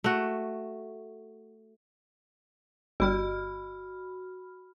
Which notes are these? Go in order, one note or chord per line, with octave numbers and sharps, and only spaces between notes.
A3 F#4
G1 G3 F#4 B5 F6